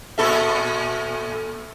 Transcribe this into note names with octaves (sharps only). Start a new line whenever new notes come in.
A#2 A4 E5